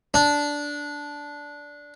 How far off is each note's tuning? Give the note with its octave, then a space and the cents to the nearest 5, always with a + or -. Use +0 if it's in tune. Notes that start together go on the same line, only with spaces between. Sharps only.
D4 -10